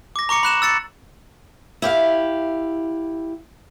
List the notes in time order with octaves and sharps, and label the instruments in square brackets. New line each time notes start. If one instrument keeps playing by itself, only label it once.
[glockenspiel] D6 A#6
A#5 C#6 D6 C#7
B5 F#6 E7 F#7
E6 A6 C#7
[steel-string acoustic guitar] E4 G4 F5